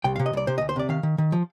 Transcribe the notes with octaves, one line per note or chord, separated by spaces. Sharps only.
C2 G5
F5
C3
D#5
C2 D5
C3 C5
D#5
D2
C5
C3 D5
D#3 F5
D#3
D#3
F3